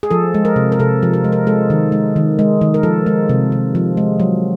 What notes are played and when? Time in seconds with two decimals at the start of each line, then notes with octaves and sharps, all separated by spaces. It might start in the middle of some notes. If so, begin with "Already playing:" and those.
0.03 G#4
0.11 F3 A4
0.34 G#3
0.45 A#4
0.56 C3
0.72 A#4
0.79 C3 A4
1.03 F3
1.13 A#4
1.24 G#3
1.32 A#4
1.47 G#3 A4
1.70 D#3
1.92 G#3
2.16 D#3
2.39 G#3
2.61 D#3
2.74 A#4
2.83 F3 A4
3.06 G#3
3.29 C3
3.52 C3
3.75 F3
3.97 G#3
4.20 F#3